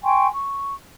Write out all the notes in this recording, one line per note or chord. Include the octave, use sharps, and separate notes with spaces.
G5 G#5 C6 C#6
C#6